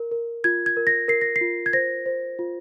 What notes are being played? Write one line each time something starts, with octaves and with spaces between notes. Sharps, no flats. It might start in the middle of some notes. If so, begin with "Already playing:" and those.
Already playing: A#4
A#4
F4 G#6
G#6
A#4
A#6
A#4 C7
A#6
C7
F4
G#6
C5 A#6
C5
F4